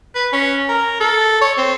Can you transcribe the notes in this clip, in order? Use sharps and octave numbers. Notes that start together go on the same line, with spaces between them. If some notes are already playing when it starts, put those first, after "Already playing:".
B4
C#4
A#4
A4
C#5
C4